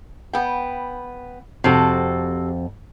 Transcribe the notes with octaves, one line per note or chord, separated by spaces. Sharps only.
B3 G5
F2 C3 F#4 A4